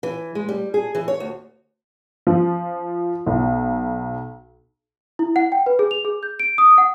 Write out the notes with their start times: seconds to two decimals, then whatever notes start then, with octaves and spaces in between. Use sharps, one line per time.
0.03 E3
0.35 G#3
0.49 G3
0.74 G#4
0.95 E3
1.08 C#5
1.20 D2
2.27 F3
3.26 B1
5.19 E4
5.36 F#5
5.52 G5
5.66 B4
5.79 G#4
5.91 F7
6.05 G#4
6.23 G6
6.40 D7
6.58 D#6
6.78 F#5